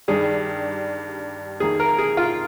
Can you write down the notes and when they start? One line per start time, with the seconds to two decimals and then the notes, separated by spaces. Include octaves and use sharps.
0.08 G2 D#3 G3 D4 G#4
1.60 F2 D#3 A#3 G#4
1.80 A#4
1.99 G#4
2.17 F4